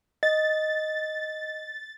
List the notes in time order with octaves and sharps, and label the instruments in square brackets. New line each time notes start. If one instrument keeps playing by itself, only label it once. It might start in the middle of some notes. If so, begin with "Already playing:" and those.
[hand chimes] D#5 [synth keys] A6